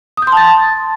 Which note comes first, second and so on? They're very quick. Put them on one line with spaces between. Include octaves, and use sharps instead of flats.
D#6 G6 C6 A5 A6